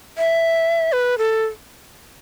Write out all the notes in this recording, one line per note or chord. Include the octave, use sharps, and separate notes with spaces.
E5
B4
A4